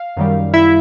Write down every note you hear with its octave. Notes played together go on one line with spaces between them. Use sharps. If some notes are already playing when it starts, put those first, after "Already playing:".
Already playing: F5
F#2 D#3 G3
E4 E5